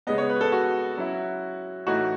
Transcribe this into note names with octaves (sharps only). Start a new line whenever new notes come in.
C#3 G#3 B3 D#5
C#5
B4
A4
F#4
F#3 C#4 E4
A2 E3 A3 D#4 F#4